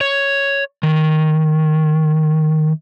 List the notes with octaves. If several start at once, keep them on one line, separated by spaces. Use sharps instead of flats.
C#5
D#3